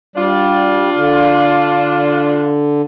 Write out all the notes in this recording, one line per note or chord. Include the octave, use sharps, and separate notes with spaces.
G3 D4 F4
D3